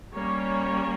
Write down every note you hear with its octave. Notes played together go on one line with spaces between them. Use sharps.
G3 A#3 C#4 C#5